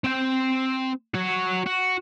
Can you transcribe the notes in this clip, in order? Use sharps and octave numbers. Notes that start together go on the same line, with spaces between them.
C4 G5
F#4 C#5
F#4